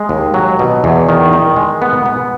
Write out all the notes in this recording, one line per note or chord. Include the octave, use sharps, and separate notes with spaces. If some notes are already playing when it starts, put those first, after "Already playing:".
Already playing: G#3
D#2
F#3
B2
E2
D#3
D#3
G#3
B3
B3